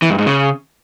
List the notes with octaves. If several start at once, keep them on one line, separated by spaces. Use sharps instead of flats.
E3
G2
G#2
C#3